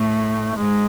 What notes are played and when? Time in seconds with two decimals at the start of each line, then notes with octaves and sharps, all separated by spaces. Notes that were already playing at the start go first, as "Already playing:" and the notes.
Already playing: A2 A3
0.57 G#2 G#3